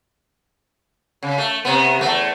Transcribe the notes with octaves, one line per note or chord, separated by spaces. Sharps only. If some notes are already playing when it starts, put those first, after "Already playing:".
C#3
A3
C3 B3
E2 A3